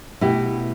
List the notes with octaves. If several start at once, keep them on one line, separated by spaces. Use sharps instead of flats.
B2 A3 E4 G4